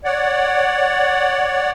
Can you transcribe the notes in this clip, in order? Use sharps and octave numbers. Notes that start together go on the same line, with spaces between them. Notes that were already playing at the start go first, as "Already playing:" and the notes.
C#5 D5 F#5